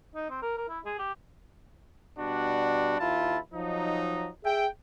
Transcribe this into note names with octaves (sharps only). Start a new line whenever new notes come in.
D#4
C4
A#4
A#4
E4
G#4
G4
B2 G3 D4 F#4
D#2 E4 F4 A5
F3 F#3 D#4
G#4 E5 G5